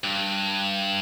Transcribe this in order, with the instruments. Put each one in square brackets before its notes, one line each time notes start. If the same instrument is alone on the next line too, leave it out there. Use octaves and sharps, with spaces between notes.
[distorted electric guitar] G2